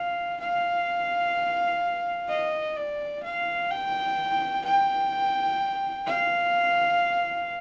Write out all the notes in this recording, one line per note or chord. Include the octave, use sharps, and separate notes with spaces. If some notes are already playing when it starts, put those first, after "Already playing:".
Already playing: F5
F5
D#5
D5
F5
G5
G5
F5